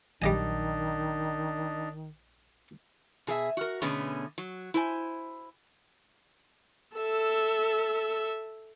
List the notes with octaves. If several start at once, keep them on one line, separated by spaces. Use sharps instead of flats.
A#1 D#3 F#3 G3 D4 D#4 D#5 G#5
B2 G#4 A4 E5
F#4 A#4
B2 D3 A3 B3 C#4 G#4
F#3
E4 C5 G#5
A4 E5